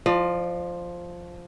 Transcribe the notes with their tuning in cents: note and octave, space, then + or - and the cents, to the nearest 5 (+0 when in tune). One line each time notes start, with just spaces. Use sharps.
F3 +0 D5 +40